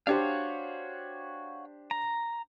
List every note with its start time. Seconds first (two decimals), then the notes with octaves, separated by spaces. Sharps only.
0.07 D4 F#4 G4 C5 C#5 F5
1.91 A#5